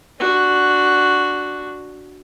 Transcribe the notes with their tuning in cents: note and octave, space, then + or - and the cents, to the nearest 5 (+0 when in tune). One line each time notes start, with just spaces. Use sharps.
D4 +0 F#4 +0